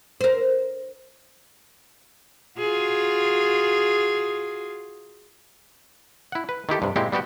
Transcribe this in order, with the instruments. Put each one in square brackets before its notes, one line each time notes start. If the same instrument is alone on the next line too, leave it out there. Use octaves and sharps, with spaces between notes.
[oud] A#4 C5
[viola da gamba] F4 F#4 G#4
[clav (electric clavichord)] E4 F#5
B4
D#3 E4 G4 A4
G2 C3
A#2 G#3 C4 E4 G4
G3 B3 F#4 G4